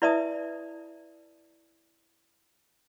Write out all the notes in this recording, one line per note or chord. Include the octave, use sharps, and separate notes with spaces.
E4 B4 D5 E5 A5 D#6